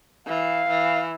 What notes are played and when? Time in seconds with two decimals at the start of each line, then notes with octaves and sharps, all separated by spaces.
0.27 E3 F5
0.69 E3